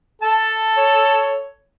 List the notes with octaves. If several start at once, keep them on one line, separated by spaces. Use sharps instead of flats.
A4 A5
C#5